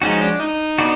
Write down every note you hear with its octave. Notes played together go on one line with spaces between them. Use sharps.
F3 G#3 C#4 D#4 F#4
D4
D#4
B3 D4 F#4